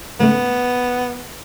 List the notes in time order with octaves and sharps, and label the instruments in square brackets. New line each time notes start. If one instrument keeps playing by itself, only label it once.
[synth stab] G#2 C#3 A3 [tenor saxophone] B3